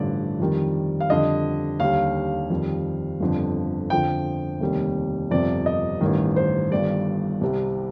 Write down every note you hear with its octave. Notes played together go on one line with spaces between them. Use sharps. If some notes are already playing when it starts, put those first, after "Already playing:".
Already playing: A1 G2 D3 F3 D5
F2 D#3 G3
F5
F2 D3 G3 D#5
D#2 D3 G3 F5
F2 D#3 G3
G1 F2 D3
F2 D3 F3 G5
F1 D#2 D#3 G3
G1 F2 C3 D5
D#5
A1 G2 D#3
C5
G1 G2 D#3 G3 D5
C2 C3 G3